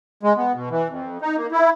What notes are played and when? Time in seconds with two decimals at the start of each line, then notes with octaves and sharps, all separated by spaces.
0.23 G#3
0.37 B3
0.55 B2
0.70 E3
0.89 F2
1.21 D#4
1.37 A#3
1.52 E4